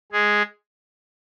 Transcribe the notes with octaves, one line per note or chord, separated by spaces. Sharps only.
G#3 G#4